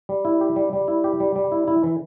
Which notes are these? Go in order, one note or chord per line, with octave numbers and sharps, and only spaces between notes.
G3
E4
G4
G3
G3
E4
G4
G3
G3
E4
E4
E3